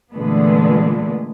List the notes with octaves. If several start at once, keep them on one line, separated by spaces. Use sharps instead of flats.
A#2 D3 E3 G#3 A3 B3